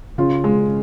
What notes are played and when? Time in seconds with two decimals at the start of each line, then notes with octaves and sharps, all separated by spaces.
0.18 C#3 F4
0.44 G#3